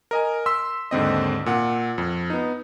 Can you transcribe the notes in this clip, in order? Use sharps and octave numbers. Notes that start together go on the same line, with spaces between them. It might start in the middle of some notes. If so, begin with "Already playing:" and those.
A#4 D#5 G#5
C6 E6 B6
D#2 G#2 D3 C4 D#5
A#2 F#5
F2
B3 D#4